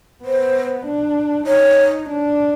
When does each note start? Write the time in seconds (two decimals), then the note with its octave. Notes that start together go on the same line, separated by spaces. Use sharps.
0.24 B3 C5
0.86 D4
1.47 D#4 C#5
2.09 D4